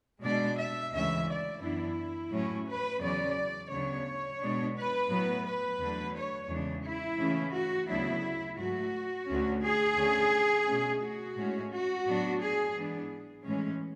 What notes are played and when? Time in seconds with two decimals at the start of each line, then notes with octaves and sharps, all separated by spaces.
0.22 B2 G#3 D4 D5
0.57 E5
0.92 D2 C#3 E3 G#3 C#4 E5
1.27 D5
1.61 F#2 E3 B3 D4 E4
2.31 A2 F#3 C#4
2.66 B4
3.01 E2 C#3 F#3 C#4 D5
3.70 D2 C#3 F#3 B3 D4 C#5
4.40 B2 G#3 B3 D4
4.74 B4
5.10 A2 F#3 B3
5.45 B4
5.79 E2 D3 F#3 A3 D4
6.14 C#5
6.49 E2 C#3 E3 G#3 D4
6.83 E4
7.18 C#3 E3 A3 C#4
7.53 F#4
7.88 D2 C#3 F#3 B3 D4 E4
8.58 G#2 F#3 A3 F#4
9.27 D2 D3 A3 C#4
9.62 G#4
9.97 D2 D3 A3 C#4
10.66 B2 A3 C#4
11.01 F#4
11.36 A2 G#3 C#4
11.71 F#4
12.06 A2 F#3 B3 D4
12.40 G#4
12.75 G#2 E3 B3 D4
13.45 A2 E3 G#3 C#4